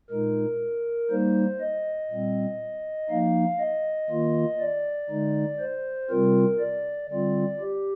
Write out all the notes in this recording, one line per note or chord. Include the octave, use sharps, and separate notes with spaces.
A#2 G#3 D#4 A#4
G3 A#3 D#4 C5
D#5
A#2 G3 C4
F3 A#3 D#4 F5
D#5
D#3 A#3 F4
D5
D3 G#3 D#4
C5
C3 G3 C4 F4 A#4
D5
D3 G3 C4 F4 D5
G4